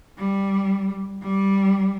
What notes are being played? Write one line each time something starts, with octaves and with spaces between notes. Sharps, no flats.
G3
G3